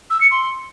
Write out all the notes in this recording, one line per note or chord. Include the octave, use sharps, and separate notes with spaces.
E6
C#7
C6